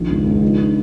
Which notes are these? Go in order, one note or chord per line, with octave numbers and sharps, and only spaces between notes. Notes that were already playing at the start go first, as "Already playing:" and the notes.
Already playing: A#1 D#3
C#2
C#2
D#4
D#4